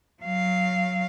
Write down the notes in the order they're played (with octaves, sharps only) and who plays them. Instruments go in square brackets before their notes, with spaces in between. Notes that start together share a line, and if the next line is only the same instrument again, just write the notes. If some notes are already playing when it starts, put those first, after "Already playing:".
[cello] F#3 F5